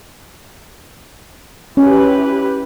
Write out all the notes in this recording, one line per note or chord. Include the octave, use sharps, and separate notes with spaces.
C#4 E4 G4 B4